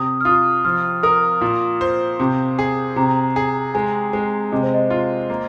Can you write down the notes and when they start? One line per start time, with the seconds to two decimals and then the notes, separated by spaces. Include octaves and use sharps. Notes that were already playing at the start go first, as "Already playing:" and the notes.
Already playing: C3 D#6
0.21 F6
0.25 F4 D#6
0.65 F3 F6
1.03 A#4 D#6
1.41 A#2
1.81 C5
2.20 C3
2.59 G#4
2.96 C3 A#5
3.36 G#4
3.74 G#3 G#5
4.13 G#3
4.52 C3 D#5
4.63 C5
4.74 D#5
4.90 F4
5.30 A#3